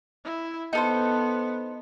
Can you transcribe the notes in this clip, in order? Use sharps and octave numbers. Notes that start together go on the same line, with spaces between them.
E4
B3 D#4 A4 C5